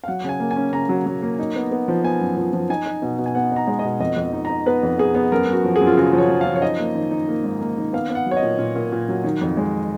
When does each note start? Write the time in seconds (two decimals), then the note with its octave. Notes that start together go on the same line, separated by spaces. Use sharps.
0.04 F5
0.08 F#3 F#5
0.24 C#3 G#5
0.40 A#3
0.51 G#5
0.56 C#4
0.73 C#3 A#5
0.89 F#3
1.06 F#3
1.22 A#3
1.39 D#4
1.56 B3
1.71 B3
1.88 F3
2.04 B3 G#5
2.21 F#2
2.37 F3
2.53 F3
2.69 D#4 G#5
2.86 D#4
3.02 B2
3.18 B2
3.26 G#5
3.35 B3 F#5
3.51 D#4
3.56 A#5
3.67 G#3
3.79 D#5
3.84 B2
4.00 F2 D#5
4.16 F2
4.33 D#4
4.45 D#4 A#5
4.66 B3 B4
4.83 F2
4.98 B3 G#4
5.15 B3
5.32 F#2 A#4
5.48 F#2
5.53 F#4
5.64 F3
5.76 G#4
5.81 F#2
5.87 F4
5.97 C#3 F#4
6.13 F3
6.18 C#5
6.29 F#2
6.41 F3 F5
6.56 C#5
6.62 D#4 D#5
6.80 A#3
6.95 D#3
7.11 D#4
7.28 A#3
7.44 G#2
7.61 A#3
7.78 D#3
7.93 B3 F5
8.10 B3
8.15 F#5
8.26 F#3
8.31 C#5
8.37 D#5
8.42 A#2
8.59 A#2
8.76 A#2
8.92 A#2
9.09 F#3
9.24 D#3
9.41 F2
9.57 G#3